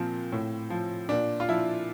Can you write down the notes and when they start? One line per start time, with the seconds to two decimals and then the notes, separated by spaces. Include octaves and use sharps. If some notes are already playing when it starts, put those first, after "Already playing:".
Already playing: A#2 F3 C4
0.32 A2
0.70 F3
1.09 A#2 D4
1.40 F4
1.48 F3 E4